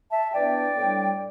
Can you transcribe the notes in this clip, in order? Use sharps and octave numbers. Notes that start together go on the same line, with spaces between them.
E5 A5
E3 B3 D4 D5 G5
A2 G3 D4